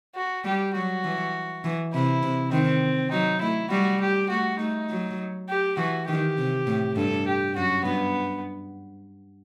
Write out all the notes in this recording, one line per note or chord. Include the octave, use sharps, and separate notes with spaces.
F#4
G3 G4
F#3 F#4
E3
E3
C3 E4
C3
D#3 C4
F#3 D#4
A3 E4
G3 F#4
G4
A3 F#4
A3 D#4
F#3
G4
E3 F#4
D#3 G4
C3
A2
G2 A4
G4
F#2 F#4
G2 B3